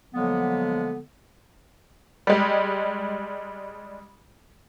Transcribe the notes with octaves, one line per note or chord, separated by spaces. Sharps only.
D3 F3 F#3 G#3 A#3 B3
G3 G#3